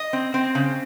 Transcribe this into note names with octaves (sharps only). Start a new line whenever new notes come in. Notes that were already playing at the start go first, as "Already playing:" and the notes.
Already playing: D#5
C4
C4
C#3